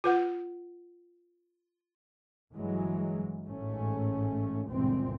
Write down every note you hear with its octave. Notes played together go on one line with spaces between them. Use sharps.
F4 B4 F#5
G1 E3 F#3 G#3
A1 G#2 A3 C#4
G1 C#2 A#2 E3 C4